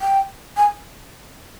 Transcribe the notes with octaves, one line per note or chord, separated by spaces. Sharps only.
G5
G#5